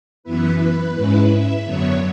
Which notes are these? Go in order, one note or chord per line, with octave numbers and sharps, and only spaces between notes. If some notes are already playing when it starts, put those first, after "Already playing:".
F#2 E3 B3 E4 B4
B4
G#2 G#3 C#4 E4 B4
E5
F#2 D3 F#3 B3 C#5